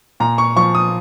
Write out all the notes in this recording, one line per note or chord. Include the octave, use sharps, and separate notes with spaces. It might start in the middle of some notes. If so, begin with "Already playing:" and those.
A#2 A#5
C#6
F3 C#6
D#6